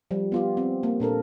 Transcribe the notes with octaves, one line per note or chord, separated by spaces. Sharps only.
F3 G3
B3 F4 G4
C4
A#3
A#2 D4 A4 A#4